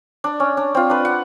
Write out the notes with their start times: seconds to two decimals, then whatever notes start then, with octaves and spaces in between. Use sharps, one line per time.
0.24 D4
0.40 C#4
0.57 D4
0.75 C4 F4
0.90 D4 B4
1.05 F#5